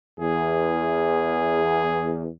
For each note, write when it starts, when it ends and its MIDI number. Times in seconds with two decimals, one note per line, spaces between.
0.20 2.28 40
0.20 2.28 68